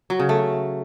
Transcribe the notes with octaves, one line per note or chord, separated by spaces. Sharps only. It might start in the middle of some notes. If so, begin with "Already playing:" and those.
F#3
C#3
A3